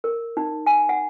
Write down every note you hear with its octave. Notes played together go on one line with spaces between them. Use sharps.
A#4
D#4
G#5
F#5